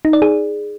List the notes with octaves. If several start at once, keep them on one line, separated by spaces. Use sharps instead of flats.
D#4
D5
G#4